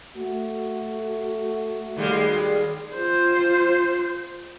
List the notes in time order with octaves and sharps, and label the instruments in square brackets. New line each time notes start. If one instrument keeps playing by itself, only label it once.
[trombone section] A3 F#4
[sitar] D#2 G3 G#3
[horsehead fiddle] F4 C5